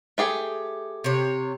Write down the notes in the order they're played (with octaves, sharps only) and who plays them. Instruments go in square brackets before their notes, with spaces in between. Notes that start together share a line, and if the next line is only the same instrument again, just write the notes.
[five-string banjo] A3 G4 G#4
[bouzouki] C3 C#5